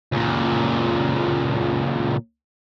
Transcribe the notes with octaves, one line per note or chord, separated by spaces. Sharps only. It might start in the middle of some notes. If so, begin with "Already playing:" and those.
C#2 A#2